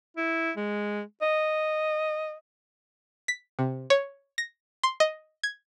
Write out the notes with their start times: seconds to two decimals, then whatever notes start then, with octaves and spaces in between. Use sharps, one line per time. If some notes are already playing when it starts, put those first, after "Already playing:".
0.17 E4
0.57 G#3
1.22 D#5
3.28 B6
3.59 C3
3.90 C#5
4.38 A#6
4.83 C6
5.00 D#5
5.43 G#6